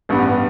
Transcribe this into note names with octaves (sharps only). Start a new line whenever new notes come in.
A1 G2 G3 B3